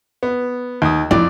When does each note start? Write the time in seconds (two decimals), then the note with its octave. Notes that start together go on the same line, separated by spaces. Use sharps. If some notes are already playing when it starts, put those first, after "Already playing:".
0.23 B3
0.82 D#2 D#6
1.11 F2 E4 D5